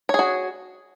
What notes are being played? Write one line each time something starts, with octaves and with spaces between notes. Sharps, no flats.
F#4 G#4 C#5